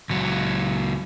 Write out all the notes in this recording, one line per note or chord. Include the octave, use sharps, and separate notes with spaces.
C#2 F#3